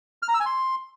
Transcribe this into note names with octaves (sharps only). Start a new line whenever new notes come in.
F6
A#5
E6
G#5
C6